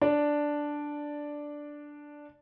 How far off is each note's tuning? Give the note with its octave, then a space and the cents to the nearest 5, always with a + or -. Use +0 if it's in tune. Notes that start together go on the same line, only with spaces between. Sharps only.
D4 +0 D5 +0